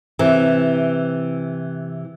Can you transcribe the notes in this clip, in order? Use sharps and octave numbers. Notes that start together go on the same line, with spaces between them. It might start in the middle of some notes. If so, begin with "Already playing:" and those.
C3 E3